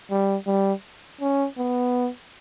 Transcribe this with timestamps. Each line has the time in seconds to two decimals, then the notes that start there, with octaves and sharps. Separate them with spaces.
0.10 G3
0.47 G3
1.21 C#4
1.58 B3